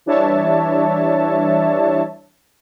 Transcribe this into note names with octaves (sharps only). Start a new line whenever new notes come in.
E3 G3 D4 C#5 E5 A5